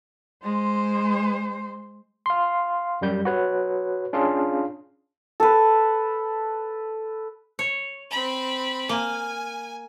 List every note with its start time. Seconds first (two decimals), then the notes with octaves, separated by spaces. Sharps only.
0.43 G#3 C5
2.26 F5 C6
3.01 F#2 G3 G6
3.25 F#4 B4 C#5
4.13 C#4 D4 F4 G#4 F5
5.40 A4 B4
7.59 C#5
8.11 C4 B5
8.89 A#3 G#5